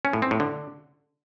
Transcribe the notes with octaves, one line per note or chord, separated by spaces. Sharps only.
C#4
A2
C4
A2
D3